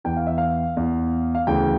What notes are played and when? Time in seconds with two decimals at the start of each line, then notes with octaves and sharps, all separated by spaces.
0.04 E2 E3 G5
0.17 F5
0.27 E5
0.38 F5
0.77 E2 E3
1.35 F5
1.47 D2 C#3 E3 G5